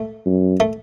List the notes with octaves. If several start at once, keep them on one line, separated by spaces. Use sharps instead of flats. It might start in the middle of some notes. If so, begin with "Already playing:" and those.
Already playing: A3
F#2
A3